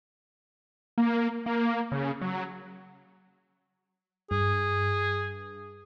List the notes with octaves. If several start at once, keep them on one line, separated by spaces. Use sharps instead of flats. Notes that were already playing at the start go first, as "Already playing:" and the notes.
A#3
A#3
C#3
F#3
G2 G#4